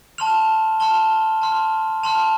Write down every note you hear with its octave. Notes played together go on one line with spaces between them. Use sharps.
A5 C6 F6 F7
A5 C6 F6 G7
A5 C6 F6
A5 C6 F6 F7